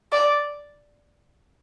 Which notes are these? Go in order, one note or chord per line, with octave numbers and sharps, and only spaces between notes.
D5